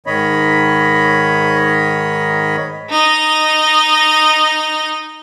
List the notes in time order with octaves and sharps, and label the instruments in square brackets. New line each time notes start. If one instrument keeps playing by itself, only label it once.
[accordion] G#2 D#3 C#5 D#5 B5
[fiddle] D#4 D#5